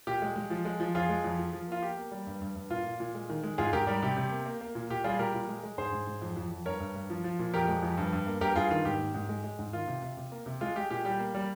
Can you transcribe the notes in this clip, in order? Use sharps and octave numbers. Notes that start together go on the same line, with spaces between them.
A#2 G4
G#3
G#3
F3
G#3
F3
F2 F4 G#4
G#3
F2
F3
F3
A#3 F4
A#3 G4
A#3
G3
G2
G2
G2
A#2 F4
A#2
A#2
G#3
D#3
G#3
G#2 F4 G#4
G#2 G4 A#4
G3 G4 A#4
C3 G4
C3
A#3
A#3
A#3
A#2
A#2 G4
G3 F4 G#4
A#2 G4 A#4
A#2
G#3
G#3
G#2 G#4 C5
G#2
G#2
F2
F2
F2
G2 A#4 C#5
G2
G2
F3
F3
A#2
F2 G4 A#4
G#3
F2
G2
G2
A#3
G2 G4 A#4
G2 F4 G#4
D#3 F4
G#2 G4
A#3
G#2
G#3
G#3
G#2
D#3 F4
C3
C3
C3
A#3
C3
G#3 F4
G#3 G4
A#2 G4
G3 G4
A#3
G3